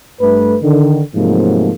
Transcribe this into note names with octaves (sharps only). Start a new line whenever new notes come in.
G2 A3 B4
D3 D#3
G#2 C3 F3 F#3 A3 A#3